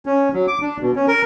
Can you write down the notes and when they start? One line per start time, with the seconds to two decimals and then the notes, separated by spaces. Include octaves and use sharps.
0.06 C#4
0.34 F#3
0.47 D6
0.62 D4
0.81 B2
0.96 C#4
1.08 A#4